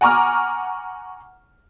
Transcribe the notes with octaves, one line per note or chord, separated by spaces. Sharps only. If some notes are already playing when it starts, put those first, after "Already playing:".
F#5 G#5 A#5 C#6 D6 F6